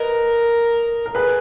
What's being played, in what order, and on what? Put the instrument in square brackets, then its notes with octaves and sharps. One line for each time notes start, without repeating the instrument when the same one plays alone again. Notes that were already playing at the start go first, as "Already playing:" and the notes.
Already playing: [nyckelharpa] A#4 [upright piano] B4 D#5
[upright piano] A#4
G#4 B4